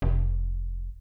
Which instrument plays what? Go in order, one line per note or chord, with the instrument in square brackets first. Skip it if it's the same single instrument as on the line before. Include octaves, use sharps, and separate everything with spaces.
[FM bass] F1